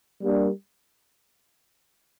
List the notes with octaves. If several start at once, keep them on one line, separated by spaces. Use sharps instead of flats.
G3 A#3 D4